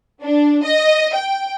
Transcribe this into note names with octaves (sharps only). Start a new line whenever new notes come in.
D4
D#5
G5